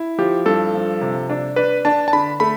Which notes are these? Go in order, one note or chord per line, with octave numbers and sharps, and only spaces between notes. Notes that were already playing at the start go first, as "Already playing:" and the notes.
Already playing: E4
F3 G4
G2 A4
F3
C3
D4
D4 B4
D4 A5
A5
D3 B5
A3 B5